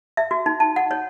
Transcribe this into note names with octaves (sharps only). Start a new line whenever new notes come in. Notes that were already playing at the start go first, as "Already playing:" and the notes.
E5
F#4
D#4
A5
F#5
C#5